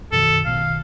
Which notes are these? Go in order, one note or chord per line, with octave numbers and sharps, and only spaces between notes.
F#2 B2 D#3 A4
B1 B2 D#3 F5